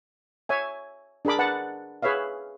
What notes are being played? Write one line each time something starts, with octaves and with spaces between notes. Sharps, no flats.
C#5 E5 G#5
D4 G#4 A#4 B5 D6
B4 F#5 A5
G#4 B4 C#5 E5 F5